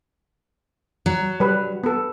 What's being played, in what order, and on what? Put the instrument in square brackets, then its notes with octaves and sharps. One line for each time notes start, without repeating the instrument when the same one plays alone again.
[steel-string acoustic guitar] F#3
[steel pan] G3 B4
B3 A4